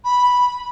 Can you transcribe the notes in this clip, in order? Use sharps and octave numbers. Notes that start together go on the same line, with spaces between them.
B5